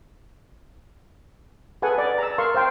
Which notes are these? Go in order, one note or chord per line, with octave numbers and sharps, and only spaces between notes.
G#4 A4 B4 F#5 G#5
D5
A#5 E6
A#4 F5 C6 C#6
C5 F5 G5 C6